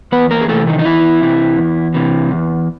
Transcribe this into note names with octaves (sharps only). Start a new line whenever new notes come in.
E2 B3 B4
A#3 A#4
G#4
C3 E3 A3 A4
D#3 D#4
D#4
E2 E3 E4
C3 E3
E2
C3 E3
E2